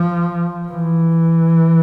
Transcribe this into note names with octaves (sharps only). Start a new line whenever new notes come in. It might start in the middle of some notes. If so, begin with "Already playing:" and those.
Already playing: F3
E3